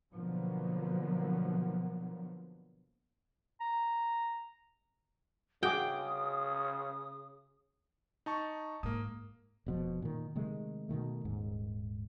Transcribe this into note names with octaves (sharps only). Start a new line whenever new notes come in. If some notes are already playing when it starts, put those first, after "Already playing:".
B2 D3 F3 F#3 A#3 B3
A#5
C#3 F#4 G#4 G5 D6 D#6
D#4 A5 C#6
G#2 A#3 D#6
F1 B2 F3
A#2 D#3
C3 D#3 G#3 A3
B2 D3 D#3 A3
D#1 G#2